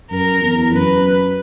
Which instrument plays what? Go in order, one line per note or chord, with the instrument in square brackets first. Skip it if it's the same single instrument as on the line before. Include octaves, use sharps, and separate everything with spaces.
[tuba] F#2 [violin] A#4
[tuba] E2
[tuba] F#2 [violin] B4